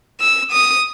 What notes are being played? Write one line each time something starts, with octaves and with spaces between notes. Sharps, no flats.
E6
D#6